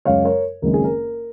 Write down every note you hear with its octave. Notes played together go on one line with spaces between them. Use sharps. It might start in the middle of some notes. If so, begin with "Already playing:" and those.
F#2 C#3 G#3 C#5 F5
A#4 C#5
F#1 F#2 D#3 G#3 C4 A#4
G#4
A#4